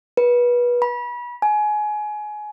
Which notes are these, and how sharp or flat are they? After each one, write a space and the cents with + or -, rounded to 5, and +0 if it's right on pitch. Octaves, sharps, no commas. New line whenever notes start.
B4 -25
B5 -30
G#5 +25